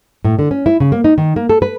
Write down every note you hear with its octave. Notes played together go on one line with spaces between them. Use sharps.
A2
D3
C#4
E4
C#3
A#3
D#4
D#3
A#3
A4
B4